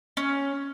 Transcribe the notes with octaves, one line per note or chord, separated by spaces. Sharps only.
C#4